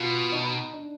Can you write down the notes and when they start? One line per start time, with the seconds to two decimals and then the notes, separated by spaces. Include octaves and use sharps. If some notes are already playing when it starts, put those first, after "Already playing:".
Already playing: B2 F4
0.32 D#4
0.73 D4